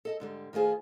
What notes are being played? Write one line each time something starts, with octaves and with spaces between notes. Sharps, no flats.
A4 D#5 A5
G#2 D3 G3
D#3 A3 F4 G#4 C5